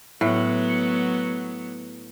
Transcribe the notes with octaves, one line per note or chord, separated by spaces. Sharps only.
A2 F#3 B3